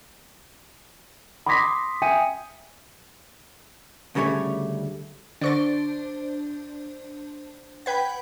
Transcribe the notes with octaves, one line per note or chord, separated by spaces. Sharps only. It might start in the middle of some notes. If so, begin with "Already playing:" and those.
B5 C6 D6 D#6 A#6 B6
E5 G5 G#5 D#6 C#7 D#7
D2 C#3 G3 A3 C#5
D3 D4 C5 C#6 A6
B4 F#5 G5 B5 G#6